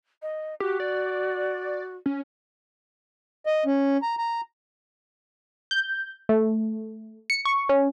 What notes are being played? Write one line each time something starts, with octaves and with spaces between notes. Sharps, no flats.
D#5
F#4 G4
D5
C#4
D#5
C#4
A#5
A#5
G6
A3
C#7
C#6
C#4